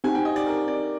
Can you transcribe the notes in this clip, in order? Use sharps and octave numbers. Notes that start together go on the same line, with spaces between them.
C4 D#4 G4 G#5
G5
D#5
D5
A#4
D5